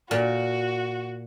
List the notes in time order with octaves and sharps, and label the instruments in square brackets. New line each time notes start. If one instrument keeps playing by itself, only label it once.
[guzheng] A#2 [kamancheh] F#4